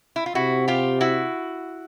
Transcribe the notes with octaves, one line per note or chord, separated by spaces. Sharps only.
E4
F4
C3 E4 F#4
F4 G4
E4 F#4